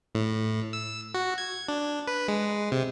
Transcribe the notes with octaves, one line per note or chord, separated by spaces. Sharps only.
A2
E6
F#4
G#6
D4
B4
G#3
C3